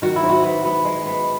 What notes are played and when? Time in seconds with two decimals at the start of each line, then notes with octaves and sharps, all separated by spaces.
0.02 D#3 F#4
0.16 E4
0.23 G#2
0.29 F#4
0.44 B3
0.65 B3
0.85 G#3
1.06 B3